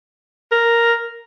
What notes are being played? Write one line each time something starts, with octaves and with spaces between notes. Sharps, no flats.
A#4